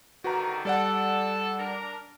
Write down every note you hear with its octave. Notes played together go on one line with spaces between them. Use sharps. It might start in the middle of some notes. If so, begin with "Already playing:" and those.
D3 D#3 G3 F#4 B4 A#5
G3 A4 D5 F#5
D4 A#4